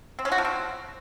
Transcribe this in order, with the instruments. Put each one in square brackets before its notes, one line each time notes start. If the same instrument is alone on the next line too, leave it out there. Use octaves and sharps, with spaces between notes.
[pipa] C4
C#4
F#4
F3
C4